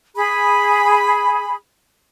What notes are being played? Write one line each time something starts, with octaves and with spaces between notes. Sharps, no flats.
G#4 B5